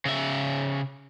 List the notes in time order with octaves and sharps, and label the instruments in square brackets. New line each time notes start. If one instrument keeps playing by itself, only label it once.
[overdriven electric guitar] C#3 E5